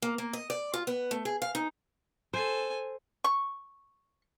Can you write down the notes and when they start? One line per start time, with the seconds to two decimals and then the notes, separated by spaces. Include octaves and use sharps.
0.02 A#3
0.18 A#3
0.33 D#5
0.50 D5
0.74 F4
0.87 B3
1.11 A3
1.25 G#4
1.42 F5
1.55 D#4
2.34 A4 C5 G#5
3.24 C#6